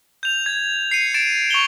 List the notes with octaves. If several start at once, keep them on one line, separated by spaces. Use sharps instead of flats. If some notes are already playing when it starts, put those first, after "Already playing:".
G6 F7
G#6
C7 C#7 D#7
A6 D7 E7
C#6 F7 G7